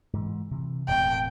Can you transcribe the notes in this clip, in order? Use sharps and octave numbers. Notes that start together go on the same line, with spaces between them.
G#2 E3
C3 E3
E1 A2 C4 G5